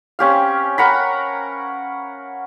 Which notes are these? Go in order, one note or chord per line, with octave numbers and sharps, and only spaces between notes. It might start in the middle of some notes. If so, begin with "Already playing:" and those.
C4 C#4 G4 F5
A#4 F#5 A#5 B5